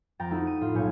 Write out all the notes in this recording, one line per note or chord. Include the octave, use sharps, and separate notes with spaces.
F2 G5 A#5 A6
A3 D#4 E4 F#4
D#7
A2 F4 A4
B1 A#2 C#5 G#5 G6 C#7